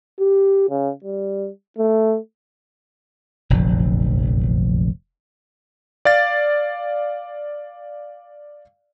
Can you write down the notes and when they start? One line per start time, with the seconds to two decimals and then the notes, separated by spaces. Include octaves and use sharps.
0.20 G4
0.70 C#3
1.04 G3
1.78 A3
3.50 F1 A#1 F#2 D3
6.05 D5 F5 A6